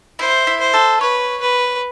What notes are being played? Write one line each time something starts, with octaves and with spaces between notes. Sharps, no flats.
E4 C5
E4
C5
A4
B4 C#5
B4